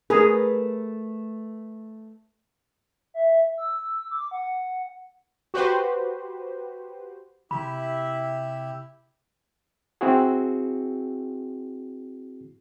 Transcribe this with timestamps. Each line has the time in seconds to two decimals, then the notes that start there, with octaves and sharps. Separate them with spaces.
0.10 A3 G#4 A#4 B4
3.14 E5
3.58 E6
4.11 D6
4.31 F#5
5.54 F#4 G4 B4 C5
7.51 C3 E4 G4 E5 B5
10.01 C4 E4 F#4 G#4